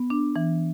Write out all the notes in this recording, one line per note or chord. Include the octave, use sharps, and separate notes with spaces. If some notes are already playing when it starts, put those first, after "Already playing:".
Already playing: B3
D4
E3